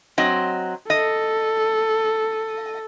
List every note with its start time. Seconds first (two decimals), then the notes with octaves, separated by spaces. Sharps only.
0.18 F#3 C4 D#5
0.90 A4 D#5